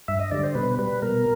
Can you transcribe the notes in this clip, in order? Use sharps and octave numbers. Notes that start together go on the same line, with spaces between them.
G2 E5
D#5
D3 G3 D5
C5
B2 B4
G3 B4
B2 A#4